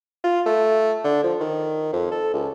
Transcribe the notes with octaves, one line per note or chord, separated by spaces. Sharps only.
F4
A3
D3
F3
D#3
F2
A4
C#2